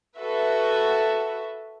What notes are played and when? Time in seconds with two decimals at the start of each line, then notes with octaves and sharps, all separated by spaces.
0.18 F#4 A4 B4 E5